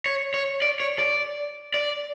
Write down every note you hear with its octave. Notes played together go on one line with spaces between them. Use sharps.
C#5
C#5
D5
C#5
D5
D5